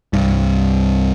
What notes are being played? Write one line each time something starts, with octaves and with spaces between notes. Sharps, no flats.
C2 G2